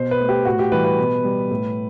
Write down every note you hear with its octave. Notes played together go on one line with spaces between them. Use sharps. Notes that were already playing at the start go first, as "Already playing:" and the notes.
Already playing: B2 C5
B4
A3
G4
A2 F#4
G4
E3 G3 B4
B4
B2
G3
A2